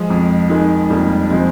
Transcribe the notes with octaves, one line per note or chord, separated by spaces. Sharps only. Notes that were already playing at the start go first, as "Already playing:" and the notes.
Already playing: F3 G#3
F2
D#3 G#3
F2 G3 A#3
F3 G#3 C4